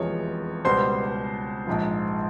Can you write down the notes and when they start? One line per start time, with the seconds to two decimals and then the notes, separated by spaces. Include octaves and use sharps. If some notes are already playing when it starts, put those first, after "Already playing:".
Already playing: F1 E2 C3 F3 G#3 C#5
0.65 C#2 B2 G3 C5 C6
1.67 A#1 G#2 F3